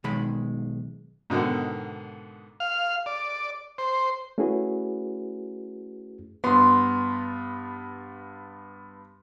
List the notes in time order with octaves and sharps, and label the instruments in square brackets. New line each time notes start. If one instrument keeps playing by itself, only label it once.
[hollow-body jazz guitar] B1 D#3 G#3 B5
[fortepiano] G#2 B2 D3 D#3
[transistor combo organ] F5
D5
C5
[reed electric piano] A3 C#4 E4 F#4 G#4 B4
[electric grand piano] G2 B3 [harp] C6